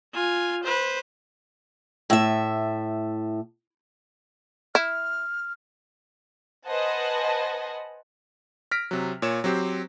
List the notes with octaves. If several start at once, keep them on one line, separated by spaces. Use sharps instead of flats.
F4 G#5
B4 C5
A2 E5
E4 F6
B4 C5 D#5 F#5 G#5 A5
F6 A#6 B6 D7
C3 F#3
A#2 C#5 E7
F#3 C4 G4 C5